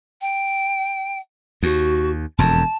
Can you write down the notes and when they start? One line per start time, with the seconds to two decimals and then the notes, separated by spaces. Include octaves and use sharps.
0.21 G5
1.63 D#2 F#4
2.38 E1 F2 A5